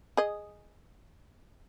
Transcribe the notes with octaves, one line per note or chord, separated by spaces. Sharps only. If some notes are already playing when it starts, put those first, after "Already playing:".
G#4 D#5